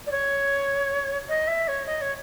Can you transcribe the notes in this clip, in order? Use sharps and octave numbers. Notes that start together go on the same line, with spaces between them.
D5
C#5
D#5
E5
C#5
D#5
C#5